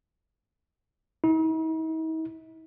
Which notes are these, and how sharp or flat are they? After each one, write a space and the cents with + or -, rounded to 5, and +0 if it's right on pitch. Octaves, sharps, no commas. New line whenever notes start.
D#4 +45